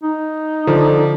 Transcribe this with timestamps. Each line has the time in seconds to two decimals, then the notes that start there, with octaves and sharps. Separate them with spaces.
0.03 D#4
0.67 D3 F3